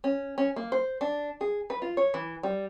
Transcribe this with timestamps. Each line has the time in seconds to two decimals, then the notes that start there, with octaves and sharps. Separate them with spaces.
0.04 C#4
0.38 C#4
0.56 A#3
0.72 C5
1.01 D4
1.41 G#4
1.70 B4
1.82 F4
1.97 C#5
2.14 E3
2.43 G3